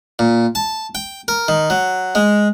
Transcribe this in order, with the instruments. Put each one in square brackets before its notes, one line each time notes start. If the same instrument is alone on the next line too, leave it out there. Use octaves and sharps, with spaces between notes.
[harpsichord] A#2
A5
G5
A#4
D#3
F#3
G#3